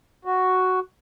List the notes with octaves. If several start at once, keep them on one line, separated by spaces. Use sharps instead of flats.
F#4